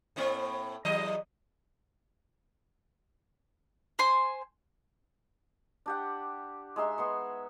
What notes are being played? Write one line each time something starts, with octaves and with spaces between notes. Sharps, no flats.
A2 A#3 C4
E2 F#3 D#5
C5 G#5 C6
D4 G4 F#5
G#3 D#4 E5 C6
B3 C6 C#6